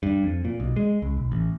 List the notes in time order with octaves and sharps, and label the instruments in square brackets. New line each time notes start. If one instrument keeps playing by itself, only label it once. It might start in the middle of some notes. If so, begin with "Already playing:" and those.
[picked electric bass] G2
F2
A#2
B1
G#3
C#2
B1
A1